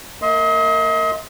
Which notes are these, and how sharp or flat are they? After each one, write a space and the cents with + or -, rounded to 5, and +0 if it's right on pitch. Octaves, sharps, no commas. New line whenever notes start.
A#3 -20 D#5 +40 C6 +0